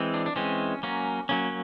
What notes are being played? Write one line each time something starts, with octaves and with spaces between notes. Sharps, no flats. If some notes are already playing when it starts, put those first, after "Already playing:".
Already playing: E3 G#3 C4
D4
D4
E3 G#3 C4 C#4
F#3 A#3 C#4
F#3 A#3 C#4